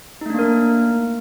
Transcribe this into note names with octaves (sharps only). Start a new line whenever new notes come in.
A3 A#3 D4 D#4 A#4